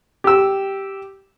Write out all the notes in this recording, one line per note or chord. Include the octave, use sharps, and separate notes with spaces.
G4 E6